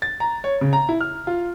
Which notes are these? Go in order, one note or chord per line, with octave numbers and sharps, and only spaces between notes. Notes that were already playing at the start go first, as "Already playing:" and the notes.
A6
A#5
C#5
C#3
A#5
E4
F6
F4